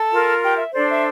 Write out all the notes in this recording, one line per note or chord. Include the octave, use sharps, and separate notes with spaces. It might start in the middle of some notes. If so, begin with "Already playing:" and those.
Already playing: A4 A5
F4 A#4
G4 G5
E5
D4 A4 C5 D5
E5